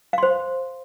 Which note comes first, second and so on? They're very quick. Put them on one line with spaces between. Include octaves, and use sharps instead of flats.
F5 C6 C5